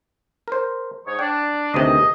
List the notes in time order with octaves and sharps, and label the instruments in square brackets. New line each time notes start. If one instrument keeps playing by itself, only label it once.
[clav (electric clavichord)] A#4 C5
[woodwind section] G#2 D#4 C#5
[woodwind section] D4 [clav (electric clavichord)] G5
[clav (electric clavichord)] D2 C3 D#3 [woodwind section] B3 G#4 D#5